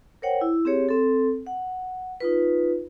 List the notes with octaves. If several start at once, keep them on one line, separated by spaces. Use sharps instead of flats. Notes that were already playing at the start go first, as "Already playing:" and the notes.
A#4 C5 C#5 F#5 G5
E4
C4 G4 G#4 C#5
C4 A4
F#5
D#4 F4 B4